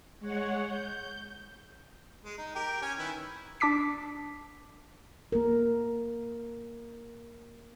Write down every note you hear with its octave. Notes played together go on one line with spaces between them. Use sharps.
G#3 C#5 F#5
G6
G#3
D#4
G4 A#4 G5
C#4 G#5
D#3 E4 B4
D4 A5 D6 B6 C7
A#3 A#4